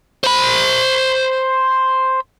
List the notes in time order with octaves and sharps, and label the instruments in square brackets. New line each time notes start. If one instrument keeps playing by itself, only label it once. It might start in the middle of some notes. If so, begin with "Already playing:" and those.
[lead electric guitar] C5 B5